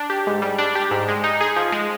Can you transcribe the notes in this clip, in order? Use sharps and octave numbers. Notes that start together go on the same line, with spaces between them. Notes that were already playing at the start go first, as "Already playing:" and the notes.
Already playing: D4
G4
G#2
G3
D4
G4
G#2
G#3
D#4
G#4
F3
G#3